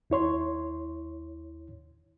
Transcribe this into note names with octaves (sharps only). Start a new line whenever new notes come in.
D#2 E4 C#5 C6